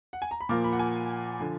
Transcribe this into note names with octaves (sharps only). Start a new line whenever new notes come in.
F#5
G#5
A#5
B5
A#2 F3 A#3 D6
B5
F#5
G#5
D3 F3